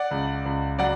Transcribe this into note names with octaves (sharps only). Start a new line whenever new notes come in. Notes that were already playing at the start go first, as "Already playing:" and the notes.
Already playing: D5 F#5
C#2
C#2
F#3 D5 F#5